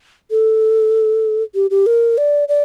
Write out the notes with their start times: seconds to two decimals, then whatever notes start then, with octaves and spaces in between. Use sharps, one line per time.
0.31 A4
1.55 G4
1.71 G4
1.86 A#4
2.18 D5
2.49 D5